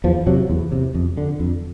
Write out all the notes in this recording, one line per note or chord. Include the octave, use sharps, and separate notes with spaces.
E2 F3
C3 F#3
E2
C3
F2
D3
F2